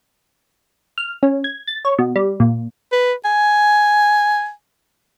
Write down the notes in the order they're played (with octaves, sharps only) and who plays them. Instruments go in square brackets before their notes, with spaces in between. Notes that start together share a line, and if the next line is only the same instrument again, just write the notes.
[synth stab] F6
C#4
G#6
A6
C#5
B2
G3
A#2
[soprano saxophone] B4
G#5